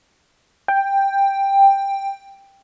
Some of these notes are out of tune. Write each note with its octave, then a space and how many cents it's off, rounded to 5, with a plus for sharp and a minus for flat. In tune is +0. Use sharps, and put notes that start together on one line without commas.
G5 +10